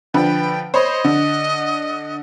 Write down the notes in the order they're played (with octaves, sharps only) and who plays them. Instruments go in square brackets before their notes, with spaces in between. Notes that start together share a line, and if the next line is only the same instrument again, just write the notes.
[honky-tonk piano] D3 F3 B4 [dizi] G5
[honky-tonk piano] C5 C#5 B5 [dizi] D#5
[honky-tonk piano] D3